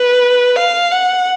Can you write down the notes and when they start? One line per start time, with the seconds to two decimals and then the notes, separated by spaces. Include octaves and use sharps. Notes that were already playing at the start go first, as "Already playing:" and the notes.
Already playing: B4
0.56 F5
0.91 F#5